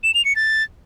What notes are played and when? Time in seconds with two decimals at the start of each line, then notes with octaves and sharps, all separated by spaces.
0.04 E7
0.14 F7
0.25 C#7
0.36 A6